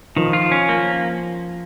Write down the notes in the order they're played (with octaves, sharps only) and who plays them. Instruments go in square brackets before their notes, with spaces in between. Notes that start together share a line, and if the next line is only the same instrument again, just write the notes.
[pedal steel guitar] D#3 [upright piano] F3
[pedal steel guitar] F4
C#4
A#3